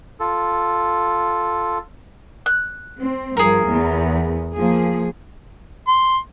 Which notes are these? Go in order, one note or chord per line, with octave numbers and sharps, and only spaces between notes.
F4 A4
F#6
C4
G2 F3 G#4 A#4
E2 B3
F3 A#3 G#4
C6